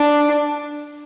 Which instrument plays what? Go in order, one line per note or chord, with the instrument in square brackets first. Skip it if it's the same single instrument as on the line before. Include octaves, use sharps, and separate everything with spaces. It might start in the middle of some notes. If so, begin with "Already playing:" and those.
Already playing: [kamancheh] D4